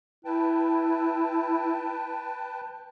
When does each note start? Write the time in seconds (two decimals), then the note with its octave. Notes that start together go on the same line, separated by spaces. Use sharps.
0.25 E4 B4 G5 A5